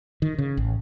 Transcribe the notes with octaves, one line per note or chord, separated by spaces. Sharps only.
D#3
C#3
A1